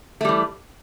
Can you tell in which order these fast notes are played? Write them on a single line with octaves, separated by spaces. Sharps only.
A3 G3 E3